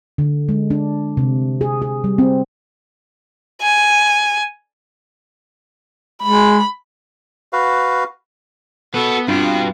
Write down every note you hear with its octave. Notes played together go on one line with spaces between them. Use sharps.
D3
G#3
D4
C3
G#4
G#4
G3
C4
G#5
G#3 B5
F#4 B4 F5
B3 F#4 A4 B4
G2 C4 D4 F4 F#4 B4